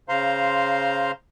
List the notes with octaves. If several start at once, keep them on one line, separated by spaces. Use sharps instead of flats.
C#3 C5 F5 A#5 C6